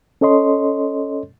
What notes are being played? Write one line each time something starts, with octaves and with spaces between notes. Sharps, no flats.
C#4 A4 C#5 D#5 C6